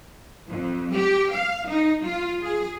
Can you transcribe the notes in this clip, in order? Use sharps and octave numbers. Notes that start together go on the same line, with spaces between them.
F2
G4
F5
D#4
F4
G#4